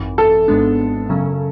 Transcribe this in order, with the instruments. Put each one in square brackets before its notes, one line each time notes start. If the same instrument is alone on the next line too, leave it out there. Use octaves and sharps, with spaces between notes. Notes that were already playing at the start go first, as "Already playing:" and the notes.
Already playing: [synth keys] G#1 F#2 E3
[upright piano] A4
[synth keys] G#1 G#2 G#3 B3 D4
F#2 C#3 F#3 C#4